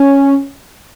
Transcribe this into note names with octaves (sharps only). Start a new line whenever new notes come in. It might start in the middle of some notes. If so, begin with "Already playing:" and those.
Already playing: C#4